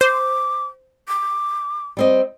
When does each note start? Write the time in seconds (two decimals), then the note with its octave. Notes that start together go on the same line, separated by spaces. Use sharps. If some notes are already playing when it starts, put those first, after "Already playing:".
0.01 C5 D6
1.08 D6
1.97 G3 C4 D#5